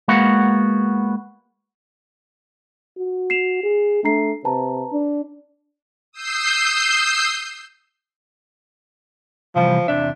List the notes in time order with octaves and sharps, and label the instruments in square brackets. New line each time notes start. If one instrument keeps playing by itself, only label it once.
[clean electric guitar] G#3 A#3 B3 F#4 F5 F#5
[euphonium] F#4
[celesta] C7 E7 F7
[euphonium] G#4
[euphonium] A3 [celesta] D4 A#5 C7
[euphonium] C3 [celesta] B4 A5 A#5
[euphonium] D4
[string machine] D#6 E6 G6 C7
[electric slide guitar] C3 E3 G3 [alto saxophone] F3
[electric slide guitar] E2 C3 E5 [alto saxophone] D4